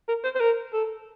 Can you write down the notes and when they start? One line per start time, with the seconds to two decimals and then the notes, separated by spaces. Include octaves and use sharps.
0.08 A#4
0.24 C5
0.35 C5
0.40 A#4
0.73 A4